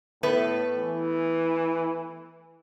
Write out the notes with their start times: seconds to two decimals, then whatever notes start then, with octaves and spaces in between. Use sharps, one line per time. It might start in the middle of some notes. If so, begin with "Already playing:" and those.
0.23 A2 A3 B3 B4
0.77 E3